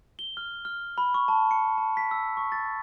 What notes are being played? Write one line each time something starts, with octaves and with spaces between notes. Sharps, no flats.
G7
F6
F6
B5
C#6
A5
C#7
A5
B6
E6
C#6
A6